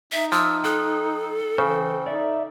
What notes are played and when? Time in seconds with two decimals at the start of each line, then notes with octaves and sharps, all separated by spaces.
0.12 D#4 E5
0.32 F3 E6
0.64 A4 G5 D#6 F#6
1.58 C#3 E3 C5 G5
2.06 D#4 D5 E5